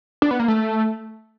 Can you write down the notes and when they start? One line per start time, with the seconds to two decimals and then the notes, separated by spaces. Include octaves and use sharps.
0.22 D4
0.31 B3
0.39 A#3
0.48 A3